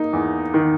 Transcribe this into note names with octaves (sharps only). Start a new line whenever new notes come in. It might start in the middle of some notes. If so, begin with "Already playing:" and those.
Already playing: A#3 D#4
E2
D#3